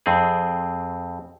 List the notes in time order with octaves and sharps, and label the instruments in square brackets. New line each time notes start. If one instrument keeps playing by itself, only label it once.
[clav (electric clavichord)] F2 C4 G#4